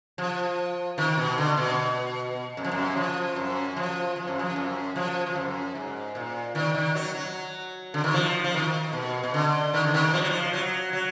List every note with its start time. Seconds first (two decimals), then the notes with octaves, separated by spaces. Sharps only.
0.18 F3
0.98 D#3
1.18 B2
1.38 D3
1.57 B2
2.57 F#2
2.64 F3
2.71 F#2
2.97 F3
3.36 F#2
3.76 F3
4.16 F3
4.27 F#2
4.39 F3
4.56 F#2
4.96 F3
5.26 F3
5.35 F#2
5.75 G#2
6.15 A#2
6.55 D#3
6.74 D#3
6.95 F#3
7.15 F#3
7.94 D3
8.04 D#3
8.14 F3
8.44 F3
8.54 D#3
8.93 B2
9.23 B2
9.34 D3
9.74 D#3
9.84 D3
9.94 D#3
10.14 F3
10.21 F#3
10.30 F3
10.53 F#3
10.93 F#3